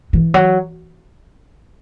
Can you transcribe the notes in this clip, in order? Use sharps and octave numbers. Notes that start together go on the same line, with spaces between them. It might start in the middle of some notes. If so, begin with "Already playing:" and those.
E3
F#3